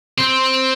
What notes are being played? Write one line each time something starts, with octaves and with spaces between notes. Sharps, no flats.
C4